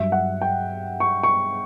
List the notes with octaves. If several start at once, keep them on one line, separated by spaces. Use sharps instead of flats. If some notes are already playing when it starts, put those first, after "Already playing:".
Already playing: G2 F#3 E5
F#5
G5
C#6
C#6